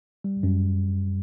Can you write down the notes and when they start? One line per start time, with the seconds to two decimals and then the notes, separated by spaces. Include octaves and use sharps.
0.24 G3
0.43 F#2